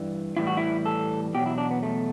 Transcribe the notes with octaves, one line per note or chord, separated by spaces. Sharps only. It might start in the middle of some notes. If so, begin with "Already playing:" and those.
Already playing: G2 E3 G3
A2 E3 G3 E4
F#4
E4
A4
E2 B2 F#3 G4
E4
D4
B3
A3